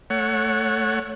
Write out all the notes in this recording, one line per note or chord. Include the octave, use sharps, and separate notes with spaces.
A3 C#5 F#5